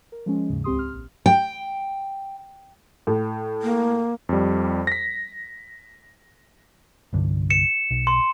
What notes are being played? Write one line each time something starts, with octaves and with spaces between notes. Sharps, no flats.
A#4
F3 G#3 C#4
D#2 G#2 C#3
C#2 C4 G4 C6 D#6
F6
A#1
G5
A2
A#3
F2 G3
A#6 B6
C2 G2 D3
C#7 E7
B1
C6